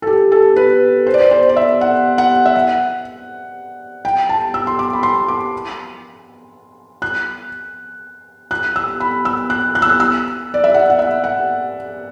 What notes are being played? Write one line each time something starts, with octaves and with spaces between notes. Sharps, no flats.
A4
G4
A4
B4
C5
D5
C5
C5
D5
E5
F#5
F#5
E5
F#5
G5
A5
E6
C6
D6
B5
C6
D6
F#6
F#6
E6
B5
E6
F#6
F#6
E6
F#6
E6
D5
E5
F#5
F#5
E5
F#5